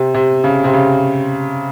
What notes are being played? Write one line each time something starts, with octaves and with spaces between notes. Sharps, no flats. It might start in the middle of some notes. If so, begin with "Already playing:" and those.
Already playing: C3
C3
C#3
C3
C#3